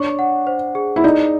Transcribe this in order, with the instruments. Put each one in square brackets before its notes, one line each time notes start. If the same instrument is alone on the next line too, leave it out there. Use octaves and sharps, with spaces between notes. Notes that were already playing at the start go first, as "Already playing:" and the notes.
Already playing: [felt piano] D4 [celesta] C#5 C#6
[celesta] F#5
C5
G#4
[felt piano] E4
[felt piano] D#4 [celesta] D5